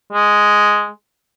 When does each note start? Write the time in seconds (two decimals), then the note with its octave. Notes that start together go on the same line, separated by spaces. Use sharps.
0.13 G#3